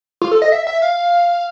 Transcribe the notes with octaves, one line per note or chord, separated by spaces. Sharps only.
F4
A4
D#5
E5
E5
F5